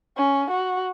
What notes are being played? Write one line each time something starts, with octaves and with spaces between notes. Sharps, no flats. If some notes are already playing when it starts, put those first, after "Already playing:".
C#4
F#4